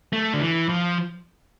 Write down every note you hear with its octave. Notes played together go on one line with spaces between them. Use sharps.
A3
D3
E3
F3